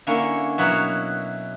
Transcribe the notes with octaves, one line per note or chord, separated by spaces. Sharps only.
D3 A#3 C#4 E4
B2 F#3 E4 F#5 A#5